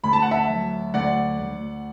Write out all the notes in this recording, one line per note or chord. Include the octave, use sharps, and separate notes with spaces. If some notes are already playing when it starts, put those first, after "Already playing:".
D2 B5
A5
F#5
E5 A5
F#3
D2 D5 F#5
D2